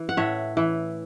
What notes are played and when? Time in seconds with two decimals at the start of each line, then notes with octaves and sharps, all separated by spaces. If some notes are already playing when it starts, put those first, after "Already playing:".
Already playing: E3
0.09 F#5
0.17 A2 C#5 E5
0.57 E3